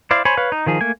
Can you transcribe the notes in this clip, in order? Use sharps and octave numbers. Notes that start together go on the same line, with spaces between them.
E4 C5 D5 F5
C5 C#5 G#5 B5
B4 C#5 F5
D#4
D#3 F3 G#4
A3 A#3 G#5